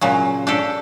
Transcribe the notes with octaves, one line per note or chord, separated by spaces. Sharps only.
A#2 C#3 F#3
D4 G4 A4